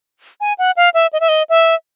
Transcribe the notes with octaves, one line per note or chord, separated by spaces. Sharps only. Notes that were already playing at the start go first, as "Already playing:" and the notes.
G#5
F#5
F5
E5
D#5
E5
D#5
E5